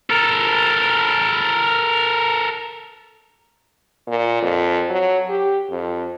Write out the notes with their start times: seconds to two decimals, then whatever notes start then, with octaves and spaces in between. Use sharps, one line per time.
0.10 A4 A#4
4.08 A#2
4.42 F2
4.90 F#3
5.29 G4
5.71 F2